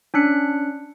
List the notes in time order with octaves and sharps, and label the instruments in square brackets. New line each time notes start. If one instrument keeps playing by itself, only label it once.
[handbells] C#4 D4 F#6 C#7